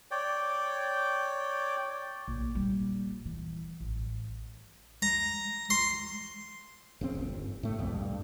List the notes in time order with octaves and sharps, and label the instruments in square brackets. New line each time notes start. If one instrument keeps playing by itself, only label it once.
[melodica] C#5 D5 G5
[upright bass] A#1
A#2 G3
E3
A1
[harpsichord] A#5
C6
[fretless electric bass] E1 C#3 C4
D1 G1
A2 A3
B1 F2
G2